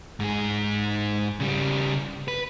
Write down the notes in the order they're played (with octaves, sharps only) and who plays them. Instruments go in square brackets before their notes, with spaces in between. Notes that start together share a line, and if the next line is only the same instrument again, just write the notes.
[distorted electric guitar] G#2 G#4
C#3 G3
B4